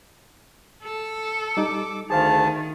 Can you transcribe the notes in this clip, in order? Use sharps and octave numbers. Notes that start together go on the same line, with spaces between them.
A4
G3 D#4 D6
D2 D#3 G#4 C5 F5 A5